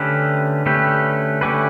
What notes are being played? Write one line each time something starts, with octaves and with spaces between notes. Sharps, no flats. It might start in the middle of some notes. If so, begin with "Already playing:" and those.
Already playing: D3 A3 C#4 G4 B4
D3 A3 C#4 G4 B4
D3 A3 C#4 G4 B4